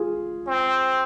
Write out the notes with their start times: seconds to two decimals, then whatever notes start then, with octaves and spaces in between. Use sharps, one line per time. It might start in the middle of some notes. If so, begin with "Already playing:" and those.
Already playing: F4 G#4
0.47 C4